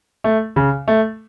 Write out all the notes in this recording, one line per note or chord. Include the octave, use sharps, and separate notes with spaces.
A3
C#3
A3